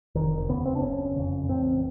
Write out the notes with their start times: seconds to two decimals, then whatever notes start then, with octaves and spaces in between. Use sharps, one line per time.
0.15 F1 D#3
0.49 D#2 C#3 B3
0.65 C4
0.76 D4
0.82 F#1 C#4
1.16 F2 C#3
1.49 A1 C4